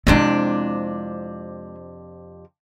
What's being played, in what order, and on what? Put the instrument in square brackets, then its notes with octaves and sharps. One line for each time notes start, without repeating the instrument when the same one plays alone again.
[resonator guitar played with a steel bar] F2 C3 D4 [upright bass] G#3 E4